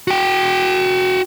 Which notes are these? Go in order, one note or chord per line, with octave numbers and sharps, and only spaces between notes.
F#4 G5